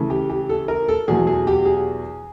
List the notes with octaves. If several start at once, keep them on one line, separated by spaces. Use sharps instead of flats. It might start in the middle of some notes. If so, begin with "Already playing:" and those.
Already playing: C#3 E3 A3
G4
G4
A4
A#4
A4
E2 B2 F#3 A3 G#4
G#4
G4
G#4